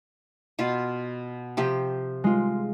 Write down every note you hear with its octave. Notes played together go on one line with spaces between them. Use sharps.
B2 F4
C3 F3 G4
G#3 F4